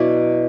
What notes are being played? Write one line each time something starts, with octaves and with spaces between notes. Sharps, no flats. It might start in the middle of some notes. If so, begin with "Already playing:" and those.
Already playing: B2 F#3 B3 D4 E4 D5